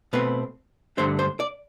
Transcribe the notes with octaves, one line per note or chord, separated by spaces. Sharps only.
B2 A3 C4 B4
G2 D3 A3 D4 C5
C5
D5